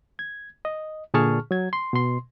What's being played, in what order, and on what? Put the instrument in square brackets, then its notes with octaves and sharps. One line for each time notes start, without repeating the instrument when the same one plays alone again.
[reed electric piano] G#6
D#5
A#2 D3 G#4 A5 C#6 F6
F#3 G#6
C6
B2 C6